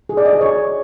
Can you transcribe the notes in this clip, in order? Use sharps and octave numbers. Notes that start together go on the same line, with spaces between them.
G#4
D5
D#5
G#4
C#5